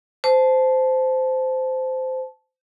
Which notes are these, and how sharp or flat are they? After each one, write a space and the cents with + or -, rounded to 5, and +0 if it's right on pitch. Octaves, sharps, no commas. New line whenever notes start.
C5 -15 A5 -15